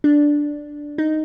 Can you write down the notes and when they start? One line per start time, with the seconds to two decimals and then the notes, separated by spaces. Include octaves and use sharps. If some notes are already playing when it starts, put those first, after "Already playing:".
0.04 D4
0.98 D#4